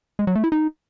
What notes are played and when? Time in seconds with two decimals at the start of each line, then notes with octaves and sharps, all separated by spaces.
0.19 G#3
0.27 F#3
0.35 A3
0.44 E4
0.52 D#4